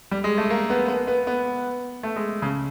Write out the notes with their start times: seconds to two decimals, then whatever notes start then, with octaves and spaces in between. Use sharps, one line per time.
0.11 G3
0.24 G#3
0.38 A3
0.50 A#3
0.70 B3
0.88 B3
1.07 B3
1.27 B3
2.03 A3
2.16 G#3
2.42 C#3